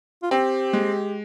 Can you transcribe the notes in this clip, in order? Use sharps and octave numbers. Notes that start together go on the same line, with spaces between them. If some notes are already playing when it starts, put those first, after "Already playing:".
F4
C4 G4
G#3